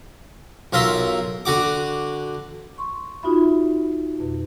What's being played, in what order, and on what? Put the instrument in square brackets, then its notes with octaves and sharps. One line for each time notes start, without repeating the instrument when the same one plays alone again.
[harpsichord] B1 F4 A#4 E5 C6
D3 F#4 D6
[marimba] C6 C#6
D#4 F4 F#4 E5 B5
F2 B2